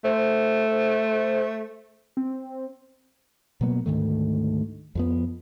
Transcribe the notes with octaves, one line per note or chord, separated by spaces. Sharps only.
A3 C5
C4
B2 F#3 A#3 B3
D2 G#2 D#3 A3
F2 F3 B3